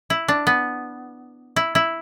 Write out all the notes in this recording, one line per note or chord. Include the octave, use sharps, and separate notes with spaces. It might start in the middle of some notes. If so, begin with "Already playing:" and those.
E4
D4
B3
E4
E4